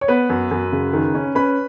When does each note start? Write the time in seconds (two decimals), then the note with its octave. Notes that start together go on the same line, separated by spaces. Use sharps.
0.01 C#5
0.08 B3 B4
0.30 F#2
0.51 F#2
0.72 C#3
0.93 D#3
1.14 C#4
1.35 C#4 B4 B5